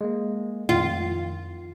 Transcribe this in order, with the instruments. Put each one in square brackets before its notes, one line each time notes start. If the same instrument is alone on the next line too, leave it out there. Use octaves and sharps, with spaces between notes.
[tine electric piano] G#3 A#3
[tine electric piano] F2 D#3 [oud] F4